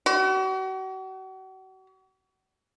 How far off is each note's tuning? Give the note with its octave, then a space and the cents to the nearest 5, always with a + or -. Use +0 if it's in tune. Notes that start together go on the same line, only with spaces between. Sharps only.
F#4 +40